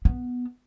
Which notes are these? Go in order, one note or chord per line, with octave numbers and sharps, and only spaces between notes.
B3